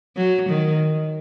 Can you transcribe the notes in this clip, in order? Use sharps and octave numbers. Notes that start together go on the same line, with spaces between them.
F#3
D#3